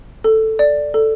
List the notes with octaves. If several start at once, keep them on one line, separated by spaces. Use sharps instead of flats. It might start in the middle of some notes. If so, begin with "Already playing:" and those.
A4
D5
A4